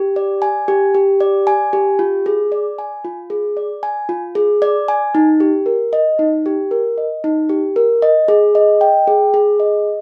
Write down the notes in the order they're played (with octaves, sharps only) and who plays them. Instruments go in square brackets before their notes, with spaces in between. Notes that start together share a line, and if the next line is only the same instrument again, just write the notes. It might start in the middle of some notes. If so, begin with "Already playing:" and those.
Already playing: [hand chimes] G4
D5
G#5
G4
G4
D5
G#5
G4
F4
G#4
D5
G#5
F4
G#4
D5
G#5
F4
G#4
D5
G#5
D#4
G4
A#4
D#5
D#4
G4
A#4
D#5
D#4
G4
A#4
D#5
G#4
D#5
G5
G#4
G#4
D#5